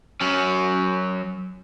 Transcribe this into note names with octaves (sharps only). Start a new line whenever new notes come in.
F#3 C#4